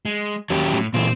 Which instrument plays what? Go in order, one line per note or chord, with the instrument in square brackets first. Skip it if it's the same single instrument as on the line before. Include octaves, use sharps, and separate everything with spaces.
[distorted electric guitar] G#3
[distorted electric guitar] D#2 [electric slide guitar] F#3 C#4 G4
[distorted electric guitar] A2
[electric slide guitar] A#2 E3 [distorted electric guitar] C4